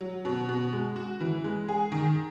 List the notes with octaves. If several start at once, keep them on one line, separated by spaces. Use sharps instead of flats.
F#3
B2
B2
G#3
F#4
E3
G#3
G#4
D#3